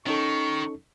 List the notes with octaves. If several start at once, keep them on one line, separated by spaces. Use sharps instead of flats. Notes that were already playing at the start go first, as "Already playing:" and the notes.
D#3 C#4 D#4 A4 C#6